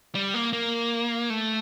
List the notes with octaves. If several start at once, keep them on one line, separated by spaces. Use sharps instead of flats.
G3
A#3
A#3
A3